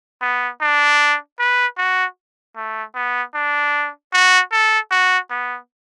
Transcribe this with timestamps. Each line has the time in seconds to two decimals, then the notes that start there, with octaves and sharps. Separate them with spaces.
0.21 B3
0.61 D4
1.39 B4
1.78 F#4
2.56 A3
2.95 B3
3.34 D4
4.13 F#4
4.52 A4
4.91 F#4
5.30 B3